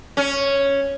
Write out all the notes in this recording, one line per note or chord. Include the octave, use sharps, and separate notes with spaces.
C#4